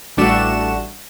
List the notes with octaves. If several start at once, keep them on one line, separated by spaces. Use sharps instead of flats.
A1 G3 A3 D4 F#4 E7